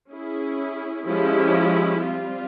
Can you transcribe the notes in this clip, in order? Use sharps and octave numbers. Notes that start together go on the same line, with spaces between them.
C#4 E4 G#4
F3 G#3 C#4 E4 G4
G3 C4 F4